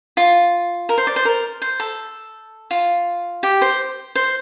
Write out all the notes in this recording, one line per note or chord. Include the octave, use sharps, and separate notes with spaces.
F4
A#4
C5
D5
C5
A#4
C5
A4
F4
G4
C5
C5